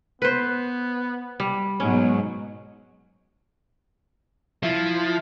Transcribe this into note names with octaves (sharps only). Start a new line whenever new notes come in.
B3 B4 C5
G3
G#2 B2 F#3 C#4 C#5
F3 E4